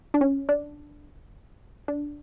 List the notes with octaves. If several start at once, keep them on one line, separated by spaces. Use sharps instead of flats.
D4
C#4
D4
D4